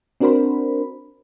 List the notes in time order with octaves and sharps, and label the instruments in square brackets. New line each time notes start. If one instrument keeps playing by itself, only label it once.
[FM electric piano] C4 D4 F#4 A#4 C5 B5